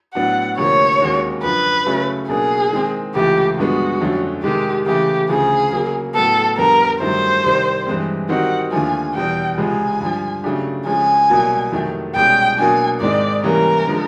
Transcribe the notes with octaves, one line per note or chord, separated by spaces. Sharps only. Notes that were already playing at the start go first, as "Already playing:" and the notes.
A2 F#3 B3 D4 F#5
D2 C3 F3 A#3 C#5
D#2 D#3 G#3 C#4 F#4
F#2 D3 F3 B4
C#3 F#3 A3 C#4
B2 F#3 A#3 D4 G#4
D#3 G#3 C4
C#2 C3 E3 A3 G4
G2 D3 F3 G#3 B3 F#4
F2 D3 F#3 A3 C#4
C3 D#3 G#3 G4
C#3 E3 A3 G4
D2 C#3 F3 G#4
C#3 F#3 A#3
A2 F#3 B3 A4
F2 D3 G3 B3 A#4
G2 D#3 F#3 A3 C5
C2 C3 D#3
G2 E3 G#3 C4
D#3 G3 C4 D#4 F#4 F#5
D#2 D3 F3 A3 G#5
E2 B2 G3 G5
C#2 C3 F3 G#3 G#5
G2 D3 F3
C#3 F#3 A3 D4 G4
C#3 F3 G#3 C#4 G#5
C2 B2 F#3 A#3
F2 C3 D#3 F#3 A3
C2 B2 G#3 C#4 G5
B2 F#3 A#3 D4 G#5
G#2 D#3 G#3 C4 D#4 D5
C3 E3 G3 A#3 C#4 A#4
D3 F3 G#3